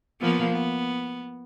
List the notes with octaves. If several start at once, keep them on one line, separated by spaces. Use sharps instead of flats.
F3 A#3 B3
B3